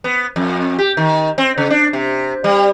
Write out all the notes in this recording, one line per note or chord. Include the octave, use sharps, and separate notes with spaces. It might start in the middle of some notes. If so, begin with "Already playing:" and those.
B3
F2
G4
D#3
C4
C#3
D4
C3
G3